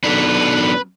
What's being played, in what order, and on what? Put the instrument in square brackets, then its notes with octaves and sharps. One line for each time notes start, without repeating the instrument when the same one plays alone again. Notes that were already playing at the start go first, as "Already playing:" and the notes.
[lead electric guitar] F#2 B2 [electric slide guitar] D4 D#4 A4 [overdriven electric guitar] B4